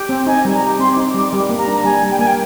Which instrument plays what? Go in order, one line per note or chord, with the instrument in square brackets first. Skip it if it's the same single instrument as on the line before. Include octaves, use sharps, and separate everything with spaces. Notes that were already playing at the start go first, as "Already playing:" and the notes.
Already playing: [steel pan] G4
C4
[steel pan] D#4 [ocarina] G#5
[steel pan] G3
[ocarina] A#5
[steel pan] G4
[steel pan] C4 [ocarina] C6
[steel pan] D#4 [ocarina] D6
[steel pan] G3 [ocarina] D6
[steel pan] G3
A#3
[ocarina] A#5
[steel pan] D4
[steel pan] G3 [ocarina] G#5
[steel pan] G3
[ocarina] G5
[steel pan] A#3 [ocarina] G#5
[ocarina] G5